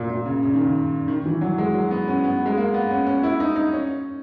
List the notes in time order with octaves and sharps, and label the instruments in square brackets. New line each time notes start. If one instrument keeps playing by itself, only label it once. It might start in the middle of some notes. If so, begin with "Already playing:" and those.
Already playing: [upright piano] A#2
A#2
C#3
C#3
D#3
C#3
D#3
E3
F#3
G#3
F#3
B3
C#4
B3
G#3
A#3
B3
C#4
C#4
E4
D#4
D#4
C#4